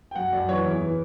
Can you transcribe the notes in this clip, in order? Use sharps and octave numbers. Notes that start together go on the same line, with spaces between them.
G5
F#2 F#5
F#2 D5
E3 C#5
E2 E4
E3